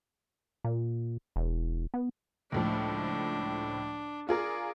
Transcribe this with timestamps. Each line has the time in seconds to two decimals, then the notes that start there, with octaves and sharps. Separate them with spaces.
0.64 A#2
1.36 E1
1.94 B3
2.52 C#2 A2 F3 D4
4.29 F4 G#4 A#4 D5